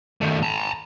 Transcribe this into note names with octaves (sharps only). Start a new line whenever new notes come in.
D#3 A3
A5 A#5